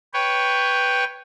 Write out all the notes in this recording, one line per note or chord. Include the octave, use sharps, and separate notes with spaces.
B4 C#5 G5